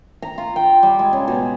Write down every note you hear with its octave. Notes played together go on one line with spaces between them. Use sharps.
A#5
F4
G5
G3
G#3
C#3
B2